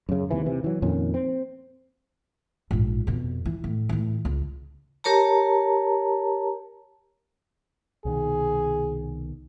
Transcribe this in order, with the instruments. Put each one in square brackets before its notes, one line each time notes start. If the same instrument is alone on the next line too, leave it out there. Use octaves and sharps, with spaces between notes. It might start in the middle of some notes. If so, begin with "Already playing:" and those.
[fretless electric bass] F#2 C#3
D#2 C3 E3
C3 E3
E3 F#3
F2 A#2 D#3 C#4
C4
[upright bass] A#1 G#2
F2 B2
E3
A2
A2 E3
C#2
[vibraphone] G4 A#4 C#5 A5 A#5
[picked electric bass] C2 B2 D#3 [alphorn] G#4